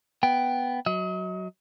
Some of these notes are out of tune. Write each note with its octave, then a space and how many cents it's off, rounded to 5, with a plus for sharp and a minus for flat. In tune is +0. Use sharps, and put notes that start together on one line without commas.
B3 +0 G5 +0
F#3 +0 D#5 +40